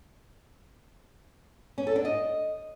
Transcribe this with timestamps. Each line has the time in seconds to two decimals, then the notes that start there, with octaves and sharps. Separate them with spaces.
1.78 C#4
1.87 A4
1.96 D4
2.05 D#5